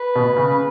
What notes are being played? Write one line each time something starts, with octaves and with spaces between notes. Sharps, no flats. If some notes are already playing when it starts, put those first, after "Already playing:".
Already playing: B4
B2
C#3